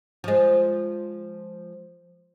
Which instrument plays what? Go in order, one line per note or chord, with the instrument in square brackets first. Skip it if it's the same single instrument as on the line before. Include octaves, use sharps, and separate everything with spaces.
[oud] F3 G#3